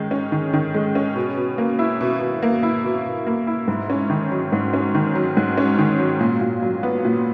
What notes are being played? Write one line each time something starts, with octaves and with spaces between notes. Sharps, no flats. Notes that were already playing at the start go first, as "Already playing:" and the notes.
Already playing: D#3 G#3 C#4
C#4
D#3
D#3
G#3
C#4
B2
B2
A#3
E4
B2
B2
A#3
E4
B2
B2
A#3
E4
G#2
C#4
D#3
F#3
G#2
C#4
D#3
F#3
G#2
C#4
D#3
F#3
A#2
A#2
F#3
B3
A#2